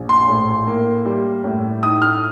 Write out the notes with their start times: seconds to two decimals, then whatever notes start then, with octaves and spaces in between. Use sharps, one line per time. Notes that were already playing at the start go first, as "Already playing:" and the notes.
Already playing: A#1
0.09 C6
0.28 A2
0.67 A#3
1.05 G3
1.44 A2
1.83 D#4 D#6
2.02 F6